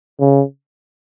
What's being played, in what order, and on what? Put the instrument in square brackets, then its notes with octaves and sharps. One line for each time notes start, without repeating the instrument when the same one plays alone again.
[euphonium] C#3